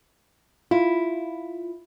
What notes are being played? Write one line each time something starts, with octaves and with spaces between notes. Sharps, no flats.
E4 F4